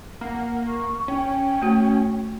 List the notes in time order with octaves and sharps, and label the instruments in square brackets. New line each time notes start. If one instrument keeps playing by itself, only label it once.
[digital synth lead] A#3 [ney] F#5
[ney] C#6
[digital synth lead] C#4 [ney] G5
[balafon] A3 F#4